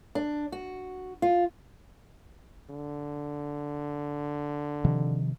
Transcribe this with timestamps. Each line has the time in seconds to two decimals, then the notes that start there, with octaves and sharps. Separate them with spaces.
0.15 D4
0.52 F#4
1.22 F4
2.70 D3
4.85 C3 D#3 F3